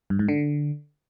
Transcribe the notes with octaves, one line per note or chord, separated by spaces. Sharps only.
G2
G#2
D3